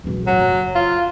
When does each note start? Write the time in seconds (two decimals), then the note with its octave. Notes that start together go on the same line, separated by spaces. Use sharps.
0.04 B1 E2
0.27 A1 F#3
0.40 F#1
0.75 F4